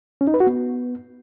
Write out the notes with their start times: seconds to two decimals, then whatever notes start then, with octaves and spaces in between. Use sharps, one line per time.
0.21 C#4
0.27 D#4
0.34 B4
0.40 F#4
0.47 B3